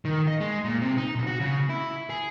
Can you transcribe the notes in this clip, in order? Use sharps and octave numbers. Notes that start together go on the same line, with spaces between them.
D#3
D#5
G#3
A#2
C3
D#4
B1
F#4
C#3
E4
G#4